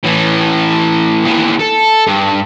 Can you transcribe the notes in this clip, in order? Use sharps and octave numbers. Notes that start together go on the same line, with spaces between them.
A2 E3
D#2 E3
A4
G2